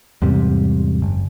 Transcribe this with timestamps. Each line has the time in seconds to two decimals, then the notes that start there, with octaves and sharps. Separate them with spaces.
0.22 E2 G#2 C3 G3
1.02 F#1